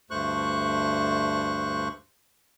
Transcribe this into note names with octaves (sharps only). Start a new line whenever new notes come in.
D2 G2 A3 C5 C#6 F#6